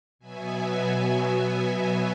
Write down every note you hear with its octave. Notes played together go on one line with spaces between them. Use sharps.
B2 F#3 B3 E5 G#5